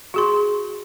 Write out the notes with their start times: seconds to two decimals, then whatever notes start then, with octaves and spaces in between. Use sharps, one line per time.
0.14 F#4 G#4 C6